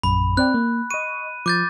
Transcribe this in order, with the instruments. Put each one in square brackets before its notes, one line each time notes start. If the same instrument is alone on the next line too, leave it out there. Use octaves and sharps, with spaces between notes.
[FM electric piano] A#1 F#2 [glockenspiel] B5
[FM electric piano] C4 D5 G5 [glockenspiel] F#6
[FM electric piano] A#3
[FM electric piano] D#5 C#6 [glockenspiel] D#7
[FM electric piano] F3 [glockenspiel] D6 G6 A6